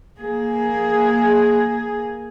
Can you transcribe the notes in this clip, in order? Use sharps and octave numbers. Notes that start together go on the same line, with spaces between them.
A#3 G#4